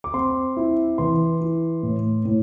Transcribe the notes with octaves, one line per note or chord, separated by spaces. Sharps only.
D6
C4 C6
E4
E3 C6
E4
A2
A2